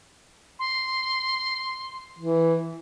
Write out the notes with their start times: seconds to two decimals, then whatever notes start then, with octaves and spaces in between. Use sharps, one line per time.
0.59 C6
2.19 E3